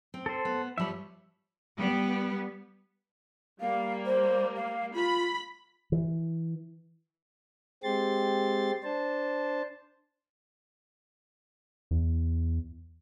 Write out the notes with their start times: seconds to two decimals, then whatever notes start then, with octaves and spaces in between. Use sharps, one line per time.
0.14 C4
0.26 A4 C5
0.45 B3
0.78 F3 G3 C#5 E5 B5
1.79 G3 B3
3.61 G3 A#3 F5
4.06 C5
4.56 F5
4.94 F4 B5
5.92 E3
7.83 G#3 C4 G4 C6 A6
8.83 D4 C5 A5
11.91 E2